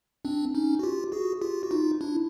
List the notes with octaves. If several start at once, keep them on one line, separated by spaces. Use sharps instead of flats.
C4 D4
C#4 D#4
F#4
F4 G4
F#4 G#4
F4 G4
F#4
D#4 F4
D4 E4